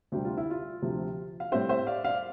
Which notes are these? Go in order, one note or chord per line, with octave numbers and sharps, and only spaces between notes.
D2 C3 G3 G4
F4
E4
F4
D2 C3 F3
F5
A2 G3 C4 C5 E5
C5 E5
D5 F5
D5 F5